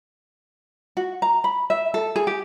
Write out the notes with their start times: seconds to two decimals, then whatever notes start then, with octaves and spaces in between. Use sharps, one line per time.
0.97 F#4
1.22 A#5
1.44 B5
1.70 E5
1.94 A4
2.16 G#4
2.27 G4